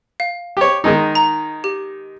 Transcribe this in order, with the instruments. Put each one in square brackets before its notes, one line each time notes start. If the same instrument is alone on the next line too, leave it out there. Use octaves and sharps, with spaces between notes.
[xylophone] F5
[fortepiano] G4 C#5
D#3 G#3 D#4
[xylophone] A#5
G4